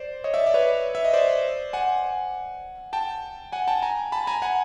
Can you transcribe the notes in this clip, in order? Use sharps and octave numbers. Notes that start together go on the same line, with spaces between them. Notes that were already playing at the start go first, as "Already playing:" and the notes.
Already playing: C5 D5
C#5 D#5
D5 E5
D5
B4 C#5
E5
D#5
C5 D5
F#5 G#5
G5 A5
F#5 G#5
G5 A5
G#5 A#5
A5 B5
G#5 A#5
F#5 G#5